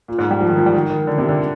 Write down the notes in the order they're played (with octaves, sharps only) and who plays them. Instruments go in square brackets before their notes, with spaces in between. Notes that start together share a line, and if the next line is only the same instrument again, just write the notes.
[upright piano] A#2
G#2
G3
F3
D#3
F3
G3
D#3
D#3
D3
C3
D3